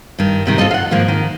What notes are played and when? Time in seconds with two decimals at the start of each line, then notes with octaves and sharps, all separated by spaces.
0.19 G2 D#3
0.46 G#2 C3 D#3
0.58 C4 F4 A4 D#5
0.71 F5 F#5
0.91 G#2 D#3 F3 A#3
1.08 D#3